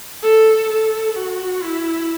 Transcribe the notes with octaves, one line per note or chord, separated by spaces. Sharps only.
A4
A4
F#4
E4